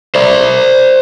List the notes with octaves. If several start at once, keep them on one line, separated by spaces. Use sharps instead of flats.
C5 D5